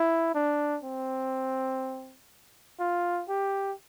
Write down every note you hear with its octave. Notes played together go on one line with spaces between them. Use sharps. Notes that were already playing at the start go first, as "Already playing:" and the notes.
Already playing: E4
D4
C4
F4
G4